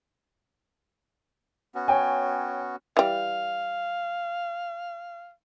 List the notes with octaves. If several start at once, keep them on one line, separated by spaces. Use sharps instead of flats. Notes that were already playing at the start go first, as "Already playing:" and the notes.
B3 C#4 F#4
C#5 G5 G#5
E3 G3 F5